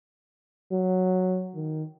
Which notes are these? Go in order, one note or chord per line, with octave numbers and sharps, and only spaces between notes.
F#3
D#3